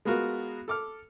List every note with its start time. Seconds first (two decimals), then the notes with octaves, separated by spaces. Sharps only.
0.05 G#3 B3 F4 F#4 A#4
0.68 A4 D6 F6